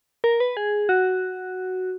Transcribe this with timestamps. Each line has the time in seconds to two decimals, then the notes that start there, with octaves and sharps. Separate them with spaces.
0.24 A#4
0.40 B4
0.57 G#4
0.89 F#4